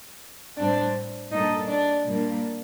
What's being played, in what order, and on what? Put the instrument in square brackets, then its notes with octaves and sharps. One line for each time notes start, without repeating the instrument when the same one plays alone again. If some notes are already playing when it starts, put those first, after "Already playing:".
[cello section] A2 G3 C4 [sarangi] D4
[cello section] A#2 G3 D4 A4 [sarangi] D#4
[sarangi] D4
[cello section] A#2 G3 A#3 D4